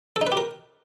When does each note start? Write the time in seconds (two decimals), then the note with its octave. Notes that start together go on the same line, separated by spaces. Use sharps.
0.16 A4
0.21 D#4
0.27 B4
0.32 G4
0.37 A#4